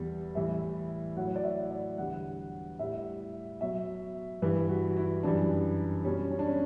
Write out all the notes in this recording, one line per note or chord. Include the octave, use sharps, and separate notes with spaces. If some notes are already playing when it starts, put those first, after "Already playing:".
Already playing: E2 G3
A2 E3 G3 E5
A2 F#3 F#5
C#5
D5
E5
D5
E2 D3 G3 F#5
A2 G3 E5
B2 F#3 E5
G2 E3 G3 B4
F#4
F#4
E4
F#2 E3 G3 D4
B2 G3 C#4
C#4
D4
C#4